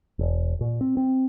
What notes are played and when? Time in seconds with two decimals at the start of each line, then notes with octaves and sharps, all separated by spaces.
0.19 E1
0.61 A#2
0.81 C4
0.97 C4